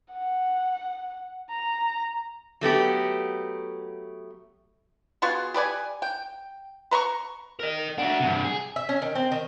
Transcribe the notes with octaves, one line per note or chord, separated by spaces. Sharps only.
F#5
A#5
F#3 A3 B3 G4
B3 F4 F#4 G#4
G4 B4 D5 G#5
G5
B4 A#5 C6 C#6
A#4 D#5
D4 F#4 E5 F#5
G2 C3
G#4
E5
C#4
D#3
C4
D#3